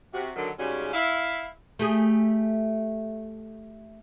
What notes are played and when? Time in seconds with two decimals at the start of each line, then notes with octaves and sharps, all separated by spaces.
0.13 C3 F#4
0.35 D3 D#3 F#3
0.58 G#2 C#3 G3 G#3 C#4 F#4
0.93 E4 F5
1.79 A3 G4 G#4